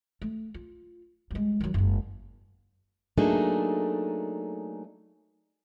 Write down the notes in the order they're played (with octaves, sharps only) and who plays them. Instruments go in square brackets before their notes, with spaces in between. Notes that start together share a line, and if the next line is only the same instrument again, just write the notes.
[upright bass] A3
F4
G3 G#3
D#3 F#3
F#1 G#2
[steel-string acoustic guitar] F#3 A3 A#3 D4 D#4 G#4